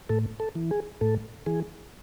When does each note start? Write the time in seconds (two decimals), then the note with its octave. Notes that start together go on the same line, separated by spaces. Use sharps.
0.09 A2 A4
0.40 A4
0.55 E3
0.71 G#4
1.01 A2 A4
1.46 E3 G#4